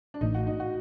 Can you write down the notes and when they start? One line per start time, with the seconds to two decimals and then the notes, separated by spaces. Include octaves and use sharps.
0.14 D4
0.21 A1 A2 A3 D#4
0.34 F#4
0.47 D#4
0.60 F#4